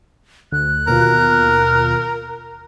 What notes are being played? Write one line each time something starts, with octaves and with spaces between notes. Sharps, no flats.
D2 F#6
D#2 B2 F4 A#4